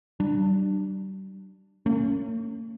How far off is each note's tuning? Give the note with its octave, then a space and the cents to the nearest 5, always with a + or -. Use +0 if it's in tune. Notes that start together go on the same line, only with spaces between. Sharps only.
G3 -35 D4 +15
A#3 -45 C#4 +0